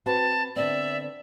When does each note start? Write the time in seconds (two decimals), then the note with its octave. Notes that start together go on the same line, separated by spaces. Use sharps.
0.06 C4 F#4 B4 A5
0.56 D3 B3 C4 D5 E5